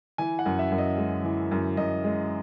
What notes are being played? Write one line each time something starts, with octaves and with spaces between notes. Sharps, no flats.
E3 G#5
F#5
F#2
E5
F#2
D#5
G#3
E3
F#2
F#2 D#5
G#3